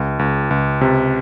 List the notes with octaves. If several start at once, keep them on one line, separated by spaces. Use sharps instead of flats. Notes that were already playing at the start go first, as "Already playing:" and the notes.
Already playing: C#2
C#2
C#2
C3